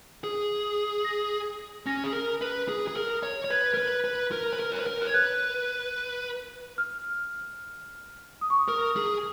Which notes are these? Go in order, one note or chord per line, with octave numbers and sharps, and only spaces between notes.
G#4
A#6
C#4 A#6
G#4
A#4
B4
G#4
G#4
A#4
C#5
C#5
B4 G#6
A#4
B4
B4
A#4
B4
A#4
C#5
B4
A#4
C#5
G#6
B4 F#6
F6
D#6
C#6
D#6
A#4
G#4